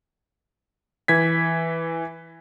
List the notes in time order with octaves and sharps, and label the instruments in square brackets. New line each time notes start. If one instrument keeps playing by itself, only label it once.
[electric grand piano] E3 G#6 B6